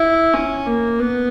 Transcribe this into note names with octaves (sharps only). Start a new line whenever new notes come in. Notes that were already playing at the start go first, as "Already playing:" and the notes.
Already playing: E4
C#4
A#3
B3